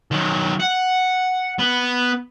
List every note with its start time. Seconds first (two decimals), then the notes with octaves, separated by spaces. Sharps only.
0.11 D#3 F#3
0.60 F#5
1.59 B3